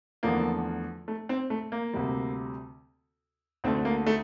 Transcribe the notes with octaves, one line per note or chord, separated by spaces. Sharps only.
E2 D3 F3 A3 A#3
A3
C4
A3
A#3
D2 C3 G3
D2 D3 A3 C4
A#3
A3